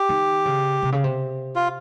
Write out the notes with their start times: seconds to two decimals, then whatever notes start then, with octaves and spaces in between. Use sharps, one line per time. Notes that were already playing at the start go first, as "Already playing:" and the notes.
Already playing: G4
0.09 D#3
0.45 C#3
0.82 C3
0.92 C#3
1.04 C3
1.56 F4